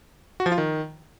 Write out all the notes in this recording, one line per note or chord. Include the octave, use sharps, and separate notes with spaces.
F#4
F3
F4
D#3